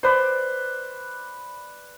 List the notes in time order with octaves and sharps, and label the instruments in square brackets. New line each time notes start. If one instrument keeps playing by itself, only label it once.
[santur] B4 D5 [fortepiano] C5